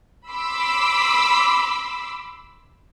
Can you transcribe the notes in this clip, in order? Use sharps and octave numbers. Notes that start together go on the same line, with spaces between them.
B5 C6 D6 E6